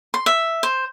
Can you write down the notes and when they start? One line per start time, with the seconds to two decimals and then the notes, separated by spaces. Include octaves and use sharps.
0.14 C6
0.26 E5
0.63 C5